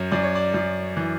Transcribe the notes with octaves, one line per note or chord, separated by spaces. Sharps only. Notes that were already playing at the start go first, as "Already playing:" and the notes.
Already playing: F#2 C#5
F#2 D5
C#5
D5
F#2
E3